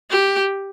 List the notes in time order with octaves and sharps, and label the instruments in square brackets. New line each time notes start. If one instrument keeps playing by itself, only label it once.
[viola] G4